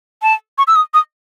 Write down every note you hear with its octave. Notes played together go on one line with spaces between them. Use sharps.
A5
C#6
E6
D#6
D#6